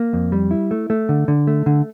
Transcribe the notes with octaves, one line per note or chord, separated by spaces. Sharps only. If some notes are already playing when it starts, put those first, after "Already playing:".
Already playing: A#3
F2
G3
E4
A3
A3
D3
D3
A3
D3